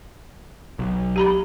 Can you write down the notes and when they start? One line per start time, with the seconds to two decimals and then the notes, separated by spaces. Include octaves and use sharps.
0.79 B1
1.16 G4 A#5 B5